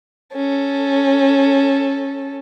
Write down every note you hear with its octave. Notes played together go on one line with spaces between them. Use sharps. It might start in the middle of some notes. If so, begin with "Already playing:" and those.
C#4 A4